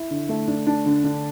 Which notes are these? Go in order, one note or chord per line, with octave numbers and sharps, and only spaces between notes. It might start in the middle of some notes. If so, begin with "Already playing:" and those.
Already playing: E4
D3
A3
D4
D4
D3
D3